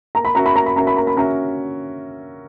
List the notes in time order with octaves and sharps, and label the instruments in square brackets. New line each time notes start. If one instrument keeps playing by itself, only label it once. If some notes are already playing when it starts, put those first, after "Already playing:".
[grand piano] A#3 [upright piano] A#5
[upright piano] B5
[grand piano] C#4 F#4 A#4 E5 [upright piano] A#5
[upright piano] B5
[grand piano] A#3 [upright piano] A#5
[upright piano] B5
[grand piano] C#4 F#4 A#4 E5 [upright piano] A#5
[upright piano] B5
[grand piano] A#3 [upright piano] A#5
[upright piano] B5
[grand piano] C#4 F#4 A#4 E5 [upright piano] A#5